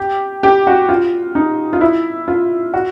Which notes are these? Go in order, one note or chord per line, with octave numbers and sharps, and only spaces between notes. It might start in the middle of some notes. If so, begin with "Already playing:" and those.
Already playing: G4
G4
F#4
F4
D#4
F4
E4
F4
F#4